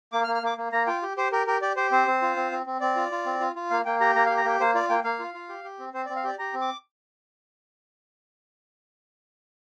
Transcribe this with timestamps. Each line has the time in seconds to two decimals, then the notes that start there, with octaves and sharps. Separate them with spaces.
0.12 A#3 D6
0.24 F6
0.27 A#3
0.35 F6
0.43 A#3 D6
0.58 A#3
0.72 A#3 A#5
0.87 F4 G5
1.02 G4
1.17 G4 C5
1.32 G4 A#4
1.47 G4 A#4
1.62 G4 D5
1.76 G4 C5
1.91 C4 C5
2.07 C4
2.22 F4
2.36 C4
2.52 C4
2.66 C4
2.80 C4 D5
2.96 F4
3.11 F4
3.26 C4
3.40 F4
3.55 F4
3.70 A#3 F5
3.85 A#3 G5
4.00 G4 A#5
4.15 A#3 A#5
4.26 F5
4.29 G4
4.37 A#5
4.45 A#3 G5
4.60 A#3 C5
4.75 F4 D5
4.89 A#3 G5
5.04 A#3 F5
5.19 F4
5.34 F4
5.49 G4
5.64 G4
5.79 C4
5.93 C4 C5
6.05 D5
6.09 C4
6.16 F5
6.24 G4 D5
6.39 G4 A#5
6.54 C4
6.61 D6